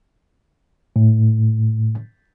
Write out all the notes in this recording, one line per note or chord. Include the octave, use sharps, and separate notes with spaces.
A2